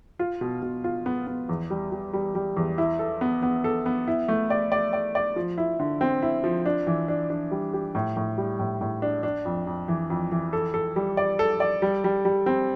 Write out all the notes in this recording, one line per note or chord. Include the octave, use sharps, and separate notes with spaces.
F4
B2
B2
F4
B3
B3
E2
G3
G3
G3
G3
E2
E4
A4
B3
B3
A4
B3
E4
A3
D5
D5
D5
D5
F3
E4
D3
C4
E4
F3
D4
E3
D4
D4
G3
G4
A2
A2
G3
A2
A2
D4
D4
F2
F2
E3
F2
E3
A4
A4
G3
D5
A4
D5
G3
G3
G3
C4